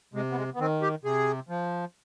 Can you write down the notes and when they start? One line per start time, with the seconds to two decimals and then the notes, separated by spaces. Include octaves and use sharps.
0.14 C3 G#3
0.31 B3
0.37 G#3
0.55 B3
0.59 D#3 C4
0.82 G4
1.04 C3 G#4
1.49 F3